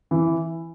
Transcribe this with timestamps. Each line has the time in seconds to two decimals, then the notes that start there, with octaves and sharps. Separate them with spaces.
0.11 E3